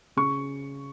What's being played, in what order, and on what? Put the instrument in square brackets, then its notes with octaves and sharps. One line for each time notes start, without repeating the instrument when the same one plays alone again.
[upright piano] C#3 C#6